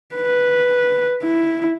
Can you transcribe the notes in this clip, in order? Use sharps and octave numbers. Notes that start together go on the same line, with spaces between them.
B4
E4